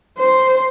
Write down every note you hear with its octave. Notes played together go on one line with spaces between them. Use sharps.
C5